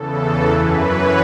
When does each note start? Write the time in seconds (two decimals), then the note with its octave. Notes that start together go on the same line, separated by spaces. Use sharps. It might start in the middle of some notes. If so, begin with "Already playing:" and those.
Already playing: E2 C#3 E3 A4
0.49 F#2 E3 B4
0.78 C#5